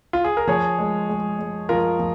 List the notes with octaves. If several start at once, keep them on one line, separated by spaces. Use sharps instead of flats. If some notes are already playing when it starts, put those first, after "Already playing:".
F4
G#4
A#4
F3 G#4 C#5
G#3
G#3
G#3
F3 F4 A#4
F3